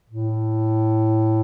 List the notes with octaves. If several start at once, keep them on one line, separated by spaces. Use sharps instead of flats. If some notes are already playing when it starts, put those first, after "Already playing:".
A2